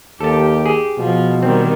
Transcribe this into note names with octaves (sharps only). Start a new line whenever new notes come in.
D#2 G4 A4 A5
G#4
B2 F3
D#3 G3 C4